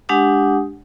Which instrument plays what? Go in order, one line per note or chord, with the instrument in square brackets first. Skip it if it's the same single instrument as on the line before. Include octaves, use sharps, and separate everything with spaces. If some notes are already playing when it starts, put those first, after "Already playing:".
[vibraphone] G#3 D4 G4 F#5 G#5 D#6